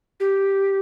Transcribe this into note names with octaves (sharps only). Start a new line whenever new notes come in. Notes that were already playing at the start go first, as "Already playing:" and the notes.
G4